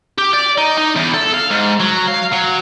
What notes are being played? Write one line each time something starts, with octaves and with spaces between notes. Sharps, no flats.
G4
D5
D#4
D#4
E2
A4
F5
G#2
F#3
F5
F#3